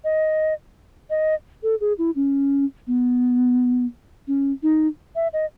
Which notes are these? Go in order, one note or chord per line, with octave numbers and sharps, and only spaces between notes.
D#5
D#5
A4
G#4
E4
C#4
B3
C#4
D#4
E5
D#5